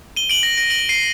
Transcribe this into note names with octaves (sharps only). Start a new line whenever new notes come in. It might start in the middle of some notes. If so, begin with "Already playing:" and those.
D#7 G7
D7 F#7
A#6 D7
A#6 D7
D7 F#7
C7 D#7